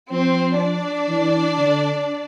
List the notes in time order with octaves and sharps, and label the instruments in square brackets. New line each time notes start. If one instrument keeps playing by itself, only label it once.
[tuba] F3 [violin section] C4 C5
[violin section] D4 D5
[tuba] E3
D3